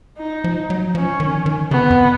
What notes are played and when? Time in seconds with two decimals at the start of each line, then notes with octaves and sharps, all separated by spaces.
0.18 D#4
0.44 F3
0.70 F#3
0.95 F3 C#4
1.20 D#3
1.46 D#3
1.71 C#3 B3
1.90 F2